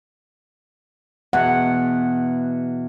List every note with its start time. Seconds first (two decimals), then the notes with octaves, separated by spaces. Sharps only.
1.33 E2 B2 F#5